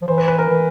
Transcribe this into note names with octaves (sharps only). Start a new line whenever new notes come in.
F3
E3 C5
B4
B4
A#4
E3